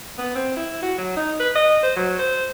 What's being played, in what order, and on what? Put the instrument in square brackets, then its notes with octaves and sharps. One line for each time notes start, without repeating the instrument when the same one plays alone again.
[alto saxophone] B3
C4
E4
F#4
F#3
D#4
B4
D#5
C5
F#3
C5